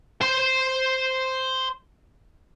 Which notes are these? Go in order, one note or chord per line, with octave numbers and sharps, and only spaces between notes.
C5 C6